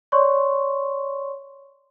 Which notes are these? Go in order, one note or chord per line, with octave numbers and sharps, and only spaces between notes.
C#5 D5 C6 C#6